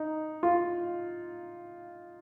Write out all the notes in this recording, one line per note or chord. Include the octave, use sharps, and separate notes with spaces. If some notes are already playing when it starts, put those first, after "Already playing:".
Already playing: D#4
F4